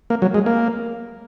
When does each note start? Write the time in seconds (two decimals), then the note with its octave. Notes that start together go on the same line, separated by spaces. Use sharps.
0.10 A#3
0.22 F#3
0.34 G#3
0.46 A#3